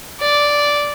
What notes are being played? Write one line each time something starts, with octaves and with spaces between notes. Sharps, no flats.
D5